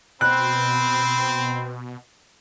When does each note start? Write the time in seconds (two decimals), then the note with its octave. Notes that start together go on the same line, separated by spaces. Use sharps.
0.21 B2 C4 B5 F#6